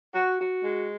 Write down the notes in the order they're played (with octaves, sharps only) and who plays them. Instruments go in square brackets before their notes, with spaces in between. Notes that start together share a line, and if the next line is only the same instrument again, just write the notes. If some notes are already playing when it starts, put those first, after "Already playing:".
[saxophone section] F#4
F#4
G#3